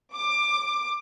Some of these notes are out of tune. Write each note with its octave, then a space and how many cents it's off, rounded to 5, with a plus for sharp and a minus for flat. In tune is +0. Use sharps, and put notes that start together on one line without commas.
D6 +20